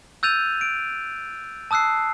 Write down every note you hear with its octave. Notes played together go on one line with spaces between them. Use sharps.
E6 F#6 G6 A6 D#7 F7
D7
A5 D#6 E6 F#6 C7